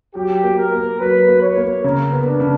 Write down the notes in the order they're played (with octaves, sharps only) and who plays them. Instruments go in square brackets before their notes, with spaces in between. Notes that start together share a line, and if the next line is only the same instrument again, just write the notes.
[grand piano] F#3 [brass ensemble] G4
[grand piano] A#3
[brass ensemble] A#4
[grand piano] A#3
[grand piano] F#3 [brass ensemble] B4
[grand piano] A#3
[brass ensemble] C#5
[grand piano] A#3
[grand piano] C#3 [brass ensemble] A#4
[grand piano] B3
[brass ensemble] D4
[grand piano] C#3